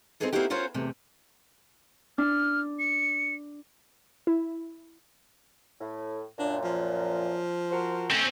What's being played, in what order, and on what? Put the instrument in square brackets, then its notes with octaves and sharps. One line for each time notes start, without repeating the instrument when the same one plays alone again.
[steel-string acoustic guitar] C4 C#4 D#4 E4 G#4 A4
A#3 C4 D#4 E4 F#4 G4
C#4 F4 F#4 A#4 C5 C#5
E2 C3 A3
[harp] D4 [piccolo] F6
[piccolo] C#7
[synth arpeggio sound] E4
[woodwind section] A2
[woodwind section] F#2 A#2 [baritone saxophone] D4
[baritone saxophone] F3
[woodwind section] F#4 A#4 C5
[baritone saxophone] A3 [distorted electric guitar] C4 C#4